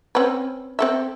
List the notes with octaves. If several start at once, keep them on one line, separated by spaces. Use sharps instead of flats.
C4 C#4 B4
C4 A4 E5